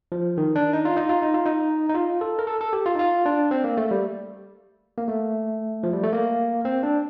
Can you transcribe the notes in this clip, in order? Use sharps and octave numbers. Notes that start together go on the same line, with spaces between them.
F3
D#3
D4
D#4
F4
D#4
F4
D#4
F4
D#4
D#4
F4
A4
A#4
A4
A4
G4
F4
D#4
F4
D4
C4
A#3
A3
G3
A#3
A3
F3
G3
A3
A#3
C4
D4